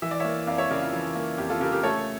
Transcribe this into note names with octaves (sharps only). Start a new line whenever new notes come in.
E3 E5
D5
A#3 C#5 E5
F2 D5 F5
C#5 E5
C#3 A#4 D5
F4
E3
A#3
F2 G4
F4 A4
C#3 G4 A#4
G4 A#4
A3 A4 C#5